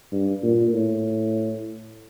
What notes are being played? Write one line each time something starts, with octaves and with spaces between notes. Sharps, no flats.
G2
A#2
A2